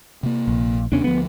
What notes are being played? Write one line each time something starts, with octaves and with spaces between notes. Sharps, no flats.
C3 A#3
A#1
D#2 C3 B3 C#4 D4
D2 F3 B3